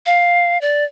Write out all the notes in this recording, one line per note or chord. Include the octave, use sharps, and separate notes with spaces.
F5
D5